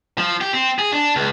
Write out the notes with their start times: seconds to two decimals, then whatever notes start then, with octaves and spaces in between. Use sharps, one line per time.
0.18 F3
0.41 G4
0.53 C4
0.79 G#4
0.92 D4
1.16 C#2